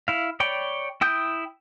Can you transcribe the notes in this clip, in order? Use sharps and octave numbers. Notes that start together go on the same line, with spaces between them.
E4 F5
C#5 D5 G5 B5
E4 G5 D#6 G6